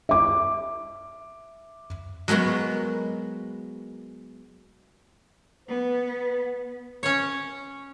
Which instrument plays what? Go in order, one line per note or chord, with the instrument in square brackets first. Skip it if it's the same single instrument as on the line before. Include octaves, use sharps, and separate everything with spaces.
[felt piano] E5 D6
[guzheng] F#3 G#3 A#3 B3 F#4
[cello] B3 [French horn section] B4
[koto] C#4 C#5